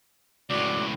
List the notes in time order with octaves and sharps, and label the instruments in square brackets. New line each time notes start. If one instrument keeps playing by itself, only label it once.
[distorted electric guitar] C#2 A2 [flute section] F#4 D5 D6